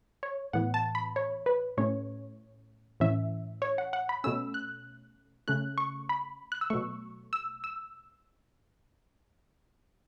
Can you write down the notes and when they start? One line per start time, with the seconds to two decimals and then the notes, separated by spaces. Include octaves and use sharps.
0.23 C#5
0.53 A2 E3 B3 F#5
0.74 A5
0.95 B5
1.16 C#5
1.46 B4
1.78 A2 A3 C#4 C#5
3.00 A2 E3 C#4 E5
3.62 C#5
3.78 F#5
3.93 F#5
4.09 B5
4.24 B2 A3 C#4 E6
4.54 F#6
5.48 C#3 A3 C#4 F#6
5.78 C#6
6.09 B5
6.52 F#6
6.61 E6
6.70 B2 F#3 A3 C#6
7.33 E6
7.64 E6